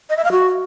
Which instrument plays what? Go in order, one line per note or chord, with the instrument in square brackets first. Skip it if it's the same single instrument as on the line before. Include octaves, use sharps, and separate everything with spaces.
[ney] D#5
E5
F5
F#4